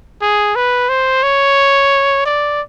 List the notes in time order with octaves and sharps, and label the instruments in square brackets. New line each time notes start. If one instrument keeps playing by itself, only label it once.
[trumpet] G#4
B4
C5
C#5
D5